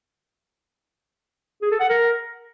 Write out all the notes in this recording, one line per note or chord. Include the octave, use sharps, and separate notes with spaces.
G#4
A4
F#5
A#4